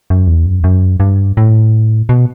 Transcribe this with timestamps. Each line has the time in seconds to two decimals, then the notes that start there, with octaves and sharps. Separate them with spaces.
0.10 F#2
0.27 E2
0.46 F#2
0.60 E2
0.64 F#2
1.00 G2
1.37 A2
2.09 B2